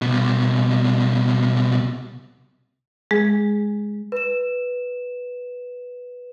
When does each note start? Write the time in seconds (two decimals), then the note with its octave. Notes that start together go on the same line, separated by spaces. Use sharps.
0.02 C2 B2
3.11 G#3 G#4
4.12 B4 E7